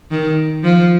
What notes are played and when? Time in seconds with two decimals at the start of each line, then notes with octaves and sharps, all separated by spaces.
0.11 D#3
0.64 F3